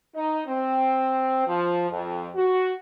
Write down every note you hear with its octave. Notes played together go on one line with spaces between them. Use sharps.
D#4
C4
F3
F2
F#4